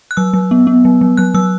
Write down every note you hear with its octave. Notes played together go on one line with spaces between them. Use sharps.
F#6
F#3 E6
F#3
B3
B3
F#3
F#3
F#3 F#6
F#3 E6